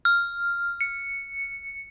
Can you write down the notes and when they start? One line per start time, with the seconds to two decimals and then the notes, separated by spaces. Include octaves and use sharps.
0.05 F6
0.81 C#7